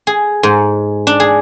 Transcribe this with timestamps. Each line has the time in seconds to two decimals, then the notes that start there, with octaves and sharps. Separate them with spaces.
0.07 G#4
0.43 G#2
1.07 D4
1.20 G#4